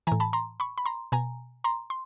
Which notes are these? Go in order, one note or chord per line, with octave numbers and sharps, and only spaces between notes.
A2 E3 G#5 A#5
A5 B5
A#5 C6
B5 C#6
B5
A#5 C6
B2 G#5 A#5
A#5 C6
C6